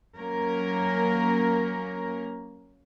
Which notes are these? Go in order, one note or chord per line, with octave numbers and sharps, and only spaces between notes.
F#3 A#3 C#4 A#4